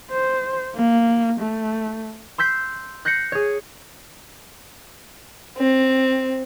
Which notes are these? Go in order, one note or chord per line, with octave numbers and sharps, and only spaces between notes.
C5
A#3
A3
C6 E6 G6 B6 C7
F#6 G6 A#6 C7 C#7
G#4 C#5
C4